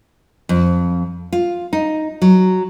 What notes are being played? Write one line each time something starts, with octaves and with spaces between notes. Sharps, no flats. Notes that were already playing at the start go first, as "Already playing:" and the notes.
F2
F4
D#4
F#3